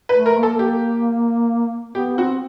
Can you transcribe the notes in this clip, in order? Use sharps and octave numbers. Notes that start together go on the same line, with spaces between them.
B4
A3
A#4
A#3
A4
G4
B3 G4
C4 F#4